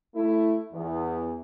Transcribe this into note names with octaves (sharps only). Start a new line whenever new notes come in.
A3 E4
E2